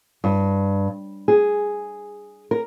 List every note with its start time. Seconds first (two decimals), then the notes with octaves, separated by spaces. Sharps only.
0.24 G2
1.28 G#4
2.51 A#4